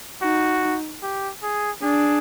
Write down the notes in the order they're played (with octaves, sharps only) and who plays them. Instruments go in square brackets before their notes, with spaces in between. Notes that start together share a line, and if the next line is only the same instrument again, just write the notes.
[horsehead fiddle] D#4 [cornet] F#4
[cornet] G4
G#4
[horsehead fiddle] D4 [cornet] G#4